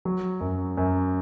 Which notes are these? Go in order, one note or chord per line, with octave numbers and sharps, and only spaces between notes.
F#3
F#2
F#2